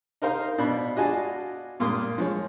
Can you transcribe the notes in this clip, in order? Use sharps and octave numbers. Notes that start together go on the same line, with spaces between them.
D#4 A#4 C5 F5
B2 D4 B5
D4 F4 F#4 D#5 G#5 A5
G2 A#2 A#3 C6 D#6
F3 G#3 C#5